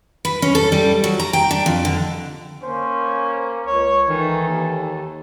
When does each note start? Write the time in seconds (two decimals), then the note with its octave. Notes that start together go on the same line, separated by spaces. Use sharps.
0.25 B4
0.42 C#4
0.55 A4
0.72 G3
1.04 F#3
1.20 A#5
1.33 G5
1.51 D4
1.66 F2
1.85 D3
2.63 A#3 C#4 C5
3.67 C#2 C#5
4.09 D#3 E3 A4
4.49 D#2